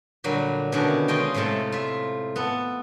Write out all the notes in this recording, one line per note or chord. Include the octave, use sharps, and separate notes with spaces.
A#2 D3 F#3 G3
B2 D3 D#3 C#4 D4 E4
G#3 C#4 F4 D#5 G5
A2 C3 G#3 A3 A5
F4 E5
B3 A4